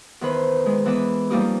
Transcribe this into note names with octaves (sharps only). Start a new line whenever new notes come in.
E2 D#3 B4 C5
D#3 G#3
E3 B3 D#5 E5 D6
F2 G3 A#3 D#4 G4 D#6